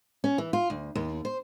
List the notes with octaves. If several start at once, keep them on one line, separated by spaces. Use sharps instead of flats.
C#4
E3
F4
D2
D#2
C5